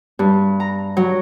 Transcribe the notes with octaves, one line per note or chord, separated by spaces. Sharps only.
G2
A#5
F#3